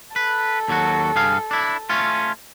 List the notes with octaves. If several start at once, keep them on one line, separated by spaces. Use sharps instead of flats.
A4 B4
D#2 F#3 F#4
G2 G#4 F5
D4 E4
A3 C#4 F4